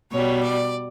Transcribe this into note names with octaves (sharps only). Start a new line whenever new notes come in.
B2 G3 C#5
D5